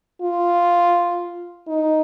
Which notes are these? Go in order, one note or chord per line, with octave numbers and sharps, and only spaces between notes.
F4
D#4